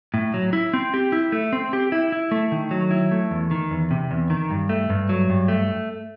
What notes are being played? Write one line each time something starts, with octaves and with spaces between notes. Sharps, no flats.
A2
F#3
E4
C4
G4
E4
A3
C4
G4
E4
E4
A3
D#3
F#3
E4
A3
E2
D#3
E2
C3
E2
D#3
G2
A3
G2
F#3
G2
A3